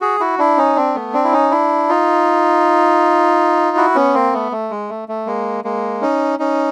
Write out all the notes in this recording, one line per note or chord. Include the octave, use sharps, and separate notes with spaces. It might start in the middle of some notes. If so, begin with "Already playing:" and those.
F#4 G#4
E4 F#4
D4 E4
C#4 D#4
C4 D4
A3 B3
C4 D4
E4
C#4 D#4
D4 E4
D#4 F4
E4 F#4
B3 C#4
A#3 C4
A3 B3
A3
G#3
A3
A3
G#3 A#3
G#3 A#3
C#4 D#4
C#4 D#4